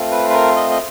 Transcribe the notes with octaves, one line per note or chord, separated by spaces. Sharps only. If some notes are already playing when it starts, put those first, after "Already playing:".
Already playing: A3 C4 F4
B4
B4
A#4
D#5
D#5